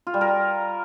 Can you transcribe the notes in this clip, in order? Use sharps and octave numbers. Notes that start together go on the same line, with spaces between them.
F4
G3
A#4